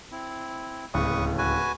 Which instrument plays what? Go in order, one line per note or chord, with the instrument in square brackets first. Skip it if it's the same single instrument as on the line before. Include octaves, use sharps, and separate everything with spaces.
[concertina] C4 E4
[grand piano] D1 C#2 A2 [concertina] B4 C#6 D#6
[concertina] F#4 B4 G#5